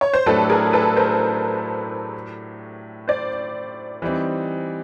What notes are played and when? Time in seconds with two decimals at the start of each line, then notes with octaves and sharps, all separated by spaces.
0.01 C#5
0.14 C5
0.26 A2 F#3 A3 D4 G4 A4 B4
0.49 G#4 A#4
0.73 A4 B4
0.97 A#4 C5
3.08 C5 D5
4.02 E3 G3 C4 D#4